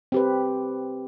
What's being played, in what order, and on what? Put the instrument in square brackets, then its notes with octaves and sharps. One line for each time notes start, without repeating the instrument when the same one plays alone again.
[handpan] C4 G4 B4